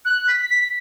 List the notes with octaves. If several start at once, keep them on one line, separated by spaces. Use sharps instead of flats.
F#6
B6
B6